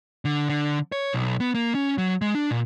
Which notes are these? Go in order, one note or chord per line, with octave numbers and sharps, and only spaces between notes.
D3
D3
C#5
B1
B3
A#3
C#4
F#3
G#3
D4
A#2